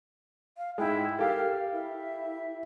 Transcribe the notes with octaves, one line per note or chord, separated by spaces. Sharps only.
F5
G#2 G#3 E4 G5
G4 A4 A#4 F5
E4 E5